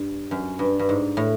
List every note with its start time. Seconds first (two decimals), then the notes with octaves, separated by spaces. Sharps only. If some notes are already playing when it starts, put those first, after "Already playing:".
Already playing: G2
0.31 F#2
0.59 G2
0.79 G2
0.89 G#2
1.17 A2